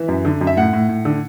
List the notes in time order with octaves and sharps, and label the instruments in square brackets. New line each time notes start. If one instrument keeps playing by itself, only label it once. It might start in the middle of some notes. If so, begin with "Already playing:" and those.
Already playing: [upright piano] E3 E5
F#2
D3
F#2
E5
A2 F#5
A2
A2
D3